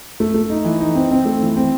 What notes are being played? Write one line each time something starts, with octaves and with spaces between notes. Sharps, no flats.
A3
A3
D#4
E3
D#4
C4
C4
A3
E3
C4